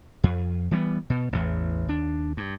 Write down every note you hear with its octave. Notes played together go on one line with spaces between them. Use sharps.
F2
E3 G3 A#3 B3
B2
A1 E2
D#2 D4
G2